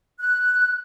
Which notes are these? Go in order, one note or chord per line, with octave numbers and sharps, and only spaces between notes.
F#6